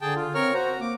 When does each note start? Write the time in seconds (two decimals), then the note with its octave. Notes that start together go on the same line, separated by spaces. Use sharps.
0.01 D3 G#4 G5 A5
0.15 F4
0.35 C4 A#4 C#5 F6
0.54 F#4 C5 A#5
0.81 A#3 D6